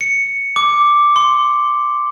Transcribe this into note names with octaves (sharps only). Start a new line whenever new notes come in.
C#7
D6
C6